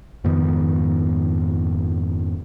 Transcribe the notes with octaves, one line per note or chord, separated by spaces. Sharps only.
F2 G#2 D#3 B3